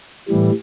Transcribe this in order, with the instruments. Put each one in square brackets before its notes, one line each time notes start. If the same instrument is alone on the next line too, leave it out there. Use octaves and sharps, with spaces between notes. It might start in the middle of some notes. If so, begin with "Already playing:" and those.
[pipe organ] A2 E3 G3